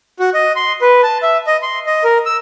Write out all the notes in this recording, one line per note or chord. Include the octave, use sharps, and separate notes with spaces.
F#4
D#5
C6
B4
A5
E5
D#5
C6
D#5
A#4
E6